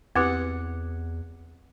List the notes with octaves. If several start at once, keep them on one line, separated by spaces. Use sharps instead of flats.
E2 C4 E4 G4 B4 F#5 D6 G#6